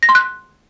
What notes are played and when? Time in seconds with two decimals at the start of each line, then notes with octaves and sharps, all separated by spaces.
0.03 A#6
0.09 C6
0.15 F#6